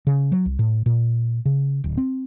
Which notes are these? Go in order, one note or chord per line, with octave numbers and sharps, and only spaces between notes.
C#3
F#3
C2
A2
A#2
C#3
D1
C4